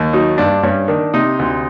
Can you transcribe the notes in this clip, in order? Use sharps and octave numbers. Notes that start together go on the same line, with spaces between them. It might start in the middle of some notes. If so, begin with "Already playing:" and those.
Already playing: D#2
F#3 D#4
G2 D4
G2 C#4
D#3 D4
C3 D#4
D2